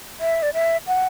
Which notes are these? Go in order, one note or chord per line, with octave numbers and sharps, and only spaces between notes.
E5
D5
E5
F#5